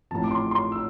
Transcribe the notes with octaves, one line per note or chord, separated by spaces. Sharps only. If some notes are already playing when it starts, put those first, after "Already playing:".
A1 A2 F3 C4 A5
D6
C6
C6
E6